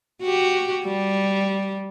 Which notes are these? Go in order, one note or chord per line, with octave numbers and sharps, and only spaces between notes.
F#4 G4
G3